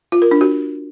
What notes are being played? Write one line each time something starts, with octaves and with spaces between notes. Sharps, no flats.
F4
A#4
D4
F#4